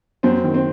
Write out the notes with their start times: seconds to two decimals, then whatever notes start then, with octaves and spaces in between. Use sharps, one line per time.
0.23 F#2 C4
0.44 D#3
0.54 C4